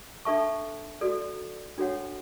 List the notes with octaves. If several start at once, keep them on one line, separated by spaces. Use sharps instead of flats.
D4 A4 E5 A5 C#6
F#4 A4 D5
D4 F#4 A4 C#5 F#5